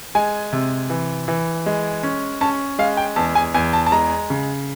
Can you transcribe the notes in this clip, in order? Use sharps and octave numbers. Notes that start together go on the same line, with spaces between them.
G#3 G#5
C3
E3
E3
G#3
C#4
C#4 A5
G#3 F5
G5
E2 A5
G#5
E2 G#5
A5
A5
G#3 A#5
C#3